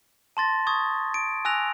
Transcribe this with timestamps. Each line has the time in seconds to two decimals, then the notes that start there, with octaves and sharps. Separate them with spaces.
0.37 A5 C6 A6 A#6
0.67 C#6 D#6 G#6
1.14 D7
1.45 G#5 E6 F#6 A#6 F7